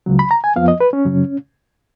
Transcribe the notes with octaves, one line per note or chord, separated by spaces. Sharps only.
C#2 C#3 F#3
B5
A#5
G#5
F2 F3 B3 F5
D#5
B4
C#4
F#2 C#3 F#3